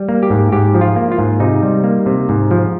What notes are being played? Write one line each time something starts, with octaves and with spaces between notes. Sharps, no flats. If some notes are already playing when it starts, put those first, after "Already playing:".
Already playing: G3
A#3
G4
G#2
G#2 G4
F3
F4
A#3
F4
G#2
C3 D#4
G3
A#3
C3
G#2
F3